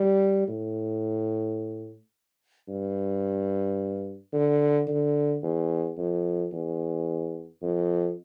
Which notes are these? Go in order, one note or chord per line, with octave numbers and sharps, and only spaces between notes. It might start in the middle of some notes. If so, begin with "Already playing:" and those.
Already playing: G3
A2
G2
D3
D3
E2
F2
E2
F2